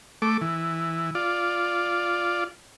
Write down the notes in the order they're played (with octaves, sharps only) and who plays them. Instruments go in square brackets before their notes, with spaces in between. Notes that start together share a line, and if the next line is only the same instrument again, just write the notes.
[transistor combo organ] A3 D6
E3
F4 D5